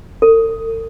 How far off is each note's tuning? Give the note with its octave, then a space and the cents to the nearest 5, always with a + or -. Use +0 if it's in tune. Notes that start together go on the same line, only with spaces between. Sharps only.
A4 +45